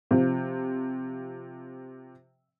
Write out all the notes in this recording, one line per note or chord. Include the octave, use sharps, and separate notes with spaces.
C3 F3